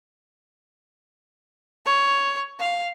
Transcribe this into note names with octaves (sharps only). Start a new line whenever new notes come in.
C#5
F5